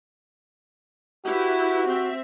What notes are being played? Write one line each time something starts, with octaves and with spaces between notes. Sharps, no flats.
E4 F#4 G4 B4
C4 E5